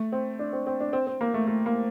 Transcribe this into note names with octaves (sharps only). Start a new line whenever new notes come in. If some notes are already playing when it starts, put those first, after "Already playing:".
Already playing: A3
C4
D4
C4
C4
D4
C4
C4
A#3
A3
A3
A#3